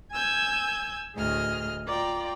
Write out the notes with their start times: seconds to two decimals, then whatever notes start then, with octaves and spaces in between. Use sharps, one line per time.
0.12 G#5 E6 G6 G#6
1.15 D2 A2 G#4 D#5 F6
1.87 F4 D5 G5 A#5